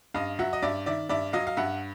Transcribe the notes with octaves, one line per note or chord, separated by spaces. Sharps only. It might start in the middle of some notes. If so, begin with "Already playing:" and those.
G2 D#5 F5
F#3 E5 F#5
D#5
G2 D5 E5
D#3 D5 E5
G2 D5 E5
F#3 D#5 F5
F5
G2 E5 F#5